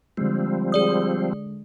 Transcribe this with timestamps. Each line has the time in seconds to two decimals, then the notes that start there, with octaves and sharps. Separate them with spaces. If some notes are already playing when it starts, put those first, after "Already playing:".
0.17 D3 F3 G3 G#3 C4
0.72 G#4 D5 D#6